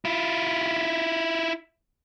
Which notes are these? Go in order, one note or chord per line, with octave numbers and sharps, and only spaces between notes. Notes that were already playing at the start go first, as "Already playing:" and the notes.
E4 F4